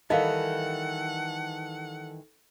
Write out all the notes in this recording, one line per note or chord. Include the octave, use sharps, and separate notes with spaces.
D#3 E3 G3 A4 D#5 F5 F#5